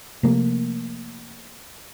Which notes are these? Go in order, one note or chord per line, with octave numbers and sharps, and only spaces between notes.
C3 F3 A3 A#3